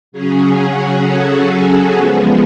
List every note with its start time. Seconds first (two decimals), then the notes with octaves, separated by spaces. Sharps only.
0.12 C#3 F#3 C#4 G#4
0.57 F#4
1.02 A4
1.91 F3 G#3 B3